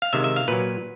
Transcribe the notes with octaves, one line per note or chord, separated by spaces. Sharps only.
F5
C3 D#3 G#3 E5
E5
F5
A#2 F#3 B4